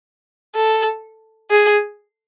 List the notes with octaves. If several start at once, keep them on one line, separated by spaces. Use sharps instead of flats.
A4
G#4